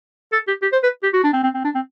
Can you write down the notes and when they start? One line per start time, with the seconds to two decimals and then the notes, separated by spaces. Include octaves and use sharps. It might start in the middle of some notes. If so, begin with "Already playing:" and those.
0.33 A4
0.48 G4
0.62 G4
0.72 C5
0.83 B4
1.04 G4
1.14 F#4
1.24 D4
1.34 C4
1.44 C4
1.55 C4
1.65 D4
1.75 C4